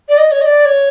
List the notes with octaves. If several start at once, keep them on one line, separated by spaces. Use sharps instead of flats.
D5
D#5
C#5
D#5
D5
C#5